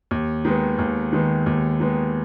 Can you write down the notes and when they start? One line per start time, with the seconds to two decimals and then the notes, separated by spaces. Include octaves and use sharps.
0.11 D#2
0.45 D#3 G#3 B3
0.79 D#2
1.13 D#3 G#3 B3
1.46 D#2
1.80 D#3 G#3 B3